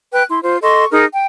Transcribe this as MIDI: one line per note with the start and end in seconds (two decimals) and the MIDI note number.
0.13 0.23 71
0.13 0.23 79
0.13 0.23 90
0.29 0.40 64
0.29 0.40 84
0.43 0.57 65
0.43 0.57 72
0.62 0.85 69
0.62 0.85 75
0.62 0.85 84
0.62 0.85 85
0.91 1.06 63
0.91 1.06 68
0.91 1.06 70
1.13 1.25 79